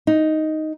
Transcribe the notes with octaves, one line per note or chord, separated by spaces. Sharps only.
D#4